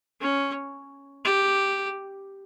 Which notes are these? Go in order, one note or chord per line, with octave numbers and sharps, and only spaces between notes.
C#4
G4